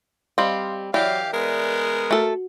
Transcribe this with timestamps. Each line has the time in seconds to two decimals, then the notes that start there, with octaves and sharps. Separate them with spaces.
0.38 G3 C4 D#5 F5 C6
0.94 E3 F#3 G4 D5 E5 F5
1.34 G#3 B3 A#4
2.11 A3 F#4 A4